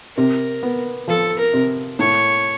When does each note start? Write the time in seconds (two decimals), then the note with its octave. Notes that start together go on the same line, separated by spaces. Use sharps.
0.16 C3 A#4
0.63 B3
1.08 F3 A4
1.39 A#4
1.53 C3
1.99 A2 C#5